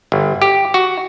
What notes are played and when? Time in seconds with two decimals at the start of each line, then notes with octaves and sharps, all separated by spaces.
0.12 G1
0.42 G4
0.74 F#4